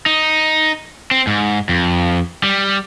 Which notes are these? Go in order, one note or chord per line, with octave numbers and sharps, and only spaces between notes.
D#4
C4
G#2
F2
G3